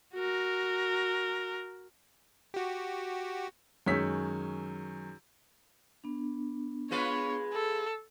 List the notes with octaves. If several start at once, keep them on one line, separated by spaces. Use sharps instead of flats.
F#4 A#4
F#4 G4
F#2 D#3 G#3 C#5 E6 B6
B3 D4
G#3 F4 B4 C#5
A4